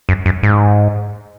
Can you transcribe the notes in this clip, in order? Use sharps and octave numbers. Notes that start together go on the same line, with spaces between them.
F#2
F#2
G#2